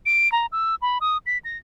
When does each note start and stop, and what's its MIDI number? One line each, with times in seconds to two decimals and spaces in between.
0.06 0.31 98
0.32 0.46 82
0.52 0.75 88
0.82 0.98 83
1.01 1.18 87
1.26 1.38 95
1.45 1.57 94